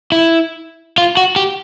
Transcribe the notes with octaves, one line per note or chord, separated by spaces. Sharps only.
E4
F4
F#4
G4